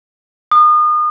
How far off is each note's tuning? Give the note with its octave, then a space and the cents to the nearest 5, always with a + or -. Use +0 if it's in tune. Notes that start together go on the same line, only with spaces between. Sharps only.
D#6 -35